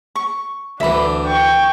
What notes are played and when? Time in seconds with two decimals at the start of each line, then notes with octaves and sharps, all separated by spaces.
0.15 C#6
0.80 D2 E3 D4 E5 B5
1.26 G5 C#6